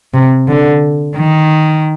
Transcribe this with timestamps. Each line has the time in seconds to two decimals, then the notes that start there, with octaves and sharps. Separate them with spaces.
0.14 C3
0.48 D3
1.16 D#3